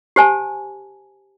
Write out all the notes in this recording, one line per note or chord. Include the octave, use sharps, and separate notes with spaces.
G4 C5 G#5 A5